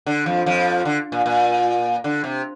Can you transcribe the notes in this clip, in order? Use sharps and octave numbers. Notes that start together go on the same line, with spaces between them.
D3
F2 F3
F2 F3
D3
A#2
A#2
D3
C3